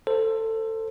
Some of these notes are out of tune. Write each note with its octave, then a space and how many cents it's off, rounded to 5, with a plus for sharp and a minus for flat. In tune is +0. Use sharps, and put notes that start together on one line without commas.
A4 +20 C5 +0